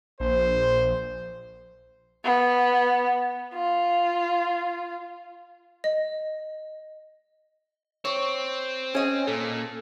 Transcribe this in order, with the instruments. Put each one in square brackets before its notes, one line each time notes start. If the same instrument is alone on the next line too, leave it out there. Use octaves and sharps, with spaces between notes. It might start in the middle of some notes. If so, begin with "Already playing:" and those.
[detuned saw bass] A#1 [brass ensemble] C5
[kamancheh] B3
F4
[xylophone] D#5
[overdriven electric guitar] C4 [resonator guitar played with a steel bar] C#5
[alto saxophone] C#4 [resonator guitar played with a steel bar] G#4 D#5
[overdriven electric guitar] A#2 [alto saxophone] A4